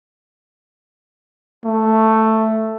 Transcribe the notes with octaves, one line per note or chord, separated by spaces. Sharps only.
A3